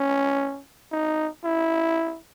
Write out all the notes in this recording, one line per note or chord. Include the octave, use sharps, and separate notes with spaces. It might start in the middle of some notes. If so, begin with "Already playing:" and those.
Already playing: C#4
D#4
E4